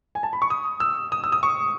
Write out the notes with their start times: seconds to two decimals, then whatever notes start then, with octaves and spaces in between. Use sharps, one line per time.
0.15 G#5
0.23 A5
0.33 B5
0.42 C#6
0.50 D#6
0.80 E6
1.12 D#6
1.24 E6
1.32 D#6
1.43 C#6